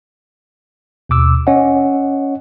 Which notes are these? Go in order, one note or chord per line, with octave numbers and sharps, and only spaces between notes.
D#2 B2 D6 E6
C#4 C#5 D#5 F#5